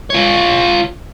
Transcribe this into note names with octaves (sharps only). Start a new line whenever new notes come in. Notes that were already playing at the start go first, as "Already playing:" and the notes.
F4 C#5